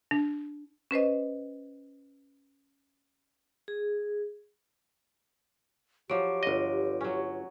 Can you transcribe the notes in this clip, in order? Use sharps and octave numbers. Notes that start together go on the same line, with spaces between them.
D4
C#4 B4 C5 D#5
G#4
F3 F#3 G4 C#5 D6 D7
G1 D#5
F#3 C#4